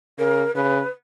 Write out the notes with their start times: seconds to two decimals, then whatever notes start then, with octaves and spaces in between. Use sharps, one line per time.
0.18 C#3 A#4
0.55 C#3 B4